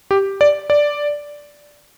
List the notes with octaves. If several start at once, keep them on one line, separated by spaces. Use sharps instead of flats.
G4
D5
D5